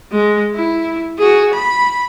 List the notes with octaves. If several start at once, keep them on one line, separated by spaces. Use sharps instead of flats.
G#3
E4
F#4 G#4
B5